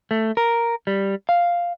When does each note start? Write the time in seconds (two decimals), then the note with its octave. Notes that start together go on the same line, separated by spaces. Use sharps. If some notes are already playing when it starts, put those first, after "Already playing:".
0.11 A3
0.37 A#4
0.87 G3
1.29 F5